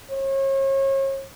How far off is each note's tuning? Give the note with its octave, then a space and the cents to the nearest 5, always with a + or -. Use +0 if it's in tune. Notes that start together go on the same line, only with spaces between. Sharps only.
C#5 -35